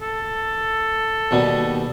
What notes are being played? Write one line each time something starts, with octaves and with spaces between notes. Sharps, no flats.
A4
D#2 B2 G3